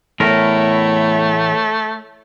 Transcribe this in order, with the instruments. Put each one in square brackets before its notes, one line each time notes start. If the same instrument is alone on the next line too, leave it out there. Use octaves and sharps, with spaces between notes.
[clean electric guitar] E2 A2 A#4 [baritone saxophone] A3 [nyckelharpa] E4 C#5